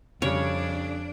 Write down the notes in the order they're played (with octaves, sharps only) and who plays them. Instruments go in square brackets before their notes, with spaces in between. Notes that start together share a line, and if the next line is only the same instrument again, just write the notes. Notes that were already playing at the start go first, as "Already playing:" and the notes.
[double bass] F2 [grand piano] C#3 G3 [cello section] D4 [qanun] C#5